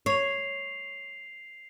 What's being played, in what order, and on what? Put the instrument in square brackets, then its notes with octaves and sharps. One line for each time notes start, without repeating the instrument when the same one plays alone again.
[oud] C#5 [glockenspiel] C7 F7